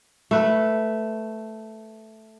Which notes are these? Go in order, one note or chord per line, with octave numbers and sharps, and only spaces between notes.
A3 B4